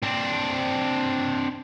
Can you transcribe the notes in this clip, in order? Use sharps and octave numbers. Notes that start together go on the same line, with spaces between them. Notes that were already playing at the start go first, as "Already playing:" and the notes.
C4 D4